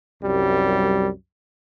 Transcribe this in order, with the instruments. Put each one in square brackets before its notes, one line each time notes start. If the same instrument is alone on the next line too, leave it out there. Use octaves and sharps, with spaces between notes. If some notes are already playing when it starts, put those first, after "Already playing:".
[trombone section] C2 F#2 G3